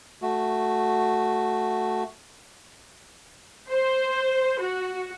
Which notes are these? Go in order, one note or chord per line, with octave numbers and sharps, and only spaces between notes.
A3 F#4
C5
F#4